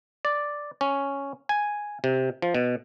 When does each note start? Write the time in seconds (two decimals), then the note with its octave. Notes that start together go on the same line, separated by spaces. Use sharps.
0.25 D5
0.81 C#4
1.49 G#5
2.04 C3
2.42 F3
2.54 B2